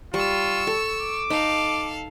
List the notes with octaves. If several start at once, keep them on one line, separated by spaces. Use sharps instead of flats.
G3 F4 C#6 E6
A4
D6
D#4 A4 F5